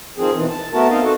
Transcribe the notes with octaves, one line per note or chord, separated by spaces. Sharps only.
D#3 F3 C4 G#4
B2 D#3 E3
A5
A3 B3 F#4 A#4 A5
B3 C4 D#4 A#4 D#5 F5
F#4 A4